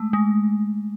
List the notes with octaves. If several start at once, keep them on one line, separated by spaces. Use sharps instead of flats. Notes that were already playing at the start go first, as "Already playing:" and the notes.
Already playing: G#3 A3
G#3